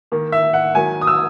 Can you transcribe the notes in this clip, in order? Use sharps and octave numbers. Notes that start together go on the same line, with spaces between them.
D#3 A#3
E5
F#5
D#3 F#3 A#3 G#5
D#6
E6